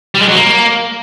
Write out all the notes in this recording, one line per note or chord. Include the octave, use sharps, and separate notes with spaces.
G3
G#3
F#3
A#3